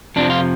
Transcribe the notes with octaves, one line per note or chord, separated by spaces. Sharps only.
F2 C3 F3 D4
F4